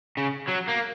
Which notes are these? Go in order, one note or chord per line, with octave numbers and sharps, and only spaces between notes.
C#3
F#3
A#3